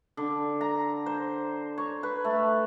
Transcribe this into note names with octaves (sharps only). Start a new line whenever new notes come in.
D3
A#5
C5
C#5
B4
A3